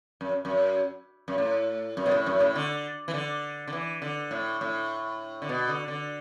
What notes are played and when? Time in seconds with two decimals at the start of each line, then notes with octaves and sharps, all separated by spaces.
0.21 F#2
0.45 F#2
1.28 F#2
1.38 A2
1.97 F#2
2.06 B2
2.11 A2
2.26 F#2
2.40 A2
2.55 D3
3.08 E3
3.14 D3
3.68 D3
3.73 E3
4.02 D3
4.31 A2
4.61 A2
5.42 D3
5.49 B2
5.68 D3
5.88 D3